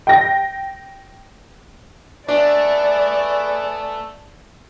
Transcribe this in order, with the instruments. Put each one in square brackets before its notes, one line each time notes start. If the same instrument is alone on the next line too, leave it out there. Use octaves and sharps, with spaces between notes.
[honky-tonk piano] G5 A#6
[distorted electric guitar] A3 [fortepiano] D4 [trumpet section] G#4 B4 [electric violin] D5